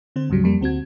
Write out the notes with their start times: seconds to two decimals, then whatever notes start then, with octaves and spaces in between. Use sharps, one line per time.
0.16 D3 C4 C5
0.30 D2 G#2 C#3 F#3 G3
0.44 F2 G3 A#3
0.61 D2 C4 F#4 G#6